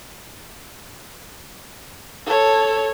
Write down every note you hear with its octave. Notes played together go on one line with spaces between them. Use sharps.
A4 C#5